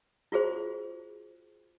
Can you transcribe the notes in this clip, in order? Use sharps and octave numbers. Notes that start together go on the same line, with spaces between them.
F4 F#4 G#4 C5